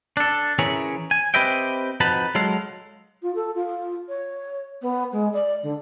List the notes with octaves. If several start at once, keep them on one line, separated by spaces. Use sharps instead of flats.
D4 A4
E3 C#4 G#4 A#4 C#5 E5
G#5
C4 G4 B4 D#5 E5 G5
F2 D#4 F#4 B4 A5 B5
F#3 G#3 A4 F5
F4
A4
F4
C#5
B3
G#3
D5
D3